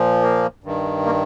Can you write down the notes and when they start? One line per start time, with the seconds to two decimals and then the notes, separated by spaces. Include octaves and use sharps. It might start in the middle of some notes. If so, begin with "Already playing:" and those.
Already playing: A#2 F3
0.22 A#3
0.64 G2 D#3
1.06 A#3